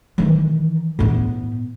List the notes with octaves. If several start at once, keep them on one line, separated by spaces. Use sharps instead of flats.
D#3 E3
A2 B3